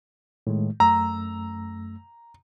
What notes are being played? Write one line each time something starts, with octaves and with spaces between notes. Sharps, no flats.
A2 D#3 G#3
F#2 A3 A#5 E6